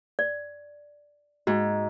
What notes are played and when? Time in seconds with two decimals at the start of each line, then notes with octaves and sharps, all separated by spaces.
0.19 D5
1.47 G#2 F#4